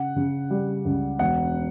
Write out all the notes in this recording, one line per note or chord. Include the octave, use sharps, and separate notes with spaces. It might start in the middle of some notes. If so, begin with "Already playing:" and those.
Already playing: C#3 F#5
C#3
G3
C#2
E1 F#5